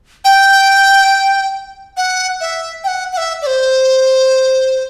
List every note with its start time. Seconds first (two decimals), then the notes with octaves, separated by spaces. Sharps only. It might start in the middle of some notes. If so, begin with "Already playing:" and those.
0.24 G5
1.97 F#5
2.41 E5
2.84 G5
2.87 F#5
3.13 F#5
3.17 E5
3.42 D5
3.46 C5